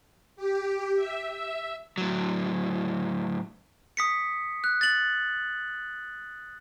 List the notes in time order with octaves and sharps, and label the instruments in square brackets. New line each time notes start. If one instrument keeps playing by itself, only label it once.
[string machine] G4
E5
E5
[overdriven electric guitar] A2 F#3
[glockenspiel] D#6 B6 C#7
F#6
A6 F#7